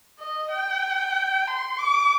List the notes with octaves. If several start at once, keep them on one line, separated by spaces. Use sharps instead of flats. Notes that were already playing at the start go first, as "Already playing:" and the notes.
D#5
G5
C6
D6